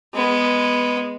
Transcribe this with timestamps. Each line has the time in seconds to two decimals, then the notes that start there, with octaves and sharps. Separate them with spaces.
0.14 G#3 B3